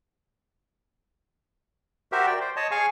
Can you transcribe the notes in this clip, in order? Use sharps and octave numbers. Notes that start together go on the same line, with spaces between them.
F#4 G4 A#4 C5 E5
D5 G5
C5
C#5 D#5 A5
G#4 F5 G#5 C#6